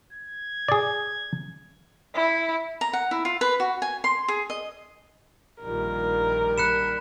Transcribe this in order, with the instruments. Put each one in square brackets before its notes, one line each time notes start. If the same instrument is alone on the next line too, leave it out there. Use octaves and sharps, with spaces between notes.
[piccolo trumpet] G#6
[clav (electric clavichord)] G#4 D5
[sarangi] E4
[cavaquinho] A#5
F#5
E4
F4
B4
F#4
G#5
C6
G#4
D#5
[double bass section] A#1 D#3 G3 [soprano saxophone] F4 [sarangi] A#4
[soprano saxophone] B5 [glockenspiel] F#6 C#7 E7